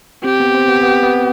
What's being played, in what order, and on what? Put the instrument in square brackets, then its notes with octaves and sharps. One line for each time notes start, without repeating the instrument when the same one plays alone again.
[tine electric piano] C4 [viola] G4
[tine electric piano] B3
C4
B3
B3
B3